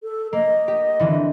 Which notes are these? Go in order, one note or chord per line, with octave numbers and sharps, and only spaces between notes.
A4
A#3 D#5
G4
D3 E3 C4